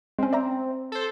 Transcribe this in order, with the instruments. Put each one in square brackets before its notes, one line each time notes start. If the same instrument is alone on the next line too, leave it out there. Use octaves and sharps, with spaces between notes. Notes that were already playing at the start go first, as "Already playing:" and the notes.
[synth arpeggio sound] G#3 C#4 [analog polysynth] C4
[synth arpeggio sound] D5 E5 A#5
[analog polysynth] A4 C5